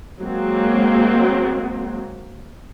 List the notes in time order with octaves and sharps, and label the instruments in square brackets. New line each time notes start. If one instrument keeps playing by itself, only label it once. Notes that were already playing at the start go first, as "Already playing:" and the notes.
[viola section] F#3 G#3 A#3 C4